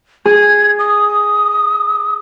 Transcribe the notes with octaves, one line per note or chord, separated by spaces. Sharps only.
G#4 G#6
D#6